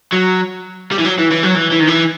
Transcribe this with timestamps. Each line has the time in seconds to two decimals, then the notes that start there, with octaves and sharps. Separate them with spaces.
0.12 F#3
0.91 G3
0.99 E3
1.05 F#3
1.18 E3
1.31 E3
1.43 F#3
1.55 E3
1.71 E3
1.79 D#3
1.87 E3